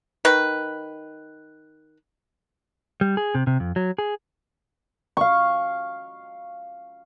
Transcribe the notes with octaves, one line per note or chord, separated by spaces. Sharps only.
D#3 B4
G3
G#4
C3
C3
F2
F#3
G#4
F5 C#6